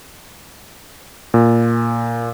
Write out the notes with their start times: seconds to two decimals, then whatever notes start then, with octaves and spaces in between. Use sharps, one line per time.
1.34 A#2